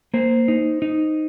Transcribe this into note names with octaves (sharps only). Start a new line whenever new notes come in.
A#3 C5
D#4
D#4